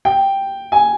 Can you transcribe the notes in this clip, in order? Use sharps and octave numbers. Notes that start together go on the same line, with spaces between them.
G5
G#5